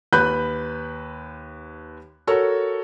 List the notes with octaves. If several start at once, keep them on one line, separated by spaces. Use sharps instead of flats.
D#2 B4 B5 F#6 G6
F#4 A4 A#4 C#5